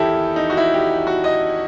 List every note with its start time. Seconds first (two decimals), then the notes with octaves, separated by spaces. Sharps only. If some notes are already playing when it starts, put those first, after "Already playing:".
Already playing: E2 D#3 E4 G4 A4
0.36 D#4
0.50 F#4
0.57 E4
0.74 G4
1.07 F#4
1.24 D#5